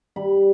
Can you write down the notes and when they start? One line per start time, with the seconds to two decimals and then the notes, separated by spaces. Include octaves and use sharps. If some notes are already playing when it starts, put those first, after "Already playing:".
0.16 G3 B5